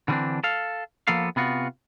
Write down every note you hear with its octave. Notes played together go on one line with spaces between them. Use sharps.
D3 E3 G3 G#3 C4 D4
A4 F5
F3 A#3 B3 A4 F5
C3 B3 F4 F#4